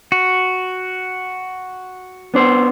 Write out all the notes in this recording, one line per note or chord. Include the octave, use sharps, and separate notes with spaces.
F#4
B3 D4 C5